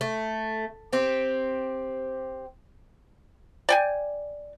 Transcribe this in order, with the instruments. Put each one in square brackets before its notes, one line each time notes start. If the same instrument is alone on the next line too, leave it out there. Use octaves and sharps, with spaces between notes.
[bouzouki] A3
C4 G4
[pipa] D5 G5 G#5